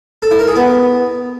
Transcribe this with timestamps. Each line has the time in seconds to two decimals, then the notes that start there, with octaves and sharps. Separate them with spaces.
0.22 A4
0.31 E4
0.39 A#4
0.47 G#4
0.56 B3